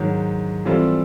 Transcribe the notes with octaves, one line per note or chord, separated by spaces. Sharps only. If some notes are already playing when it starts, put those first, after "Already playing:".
Already playing: G#2 D#3 F#3
E3 G3 C4 F4 A4